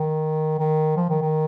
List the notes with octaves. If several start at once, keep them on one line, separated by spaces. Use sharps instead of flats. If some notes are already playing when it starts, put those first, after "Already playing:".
Already playing: D#3
D#3
F3
D#3
D#3